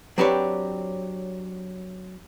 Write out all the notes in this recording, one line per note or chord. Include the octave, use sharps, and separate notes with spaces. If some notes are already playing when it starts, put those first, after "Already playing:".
F#3 C4 D4 G4 B4 C#5